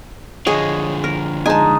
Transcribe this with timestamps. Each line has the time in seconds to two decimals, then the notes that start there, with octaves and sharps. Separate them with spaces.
0.47 D3 F3 G#4 C#5 D#5
1.04 A#4
1.46 G#3 D#4 G#5 A5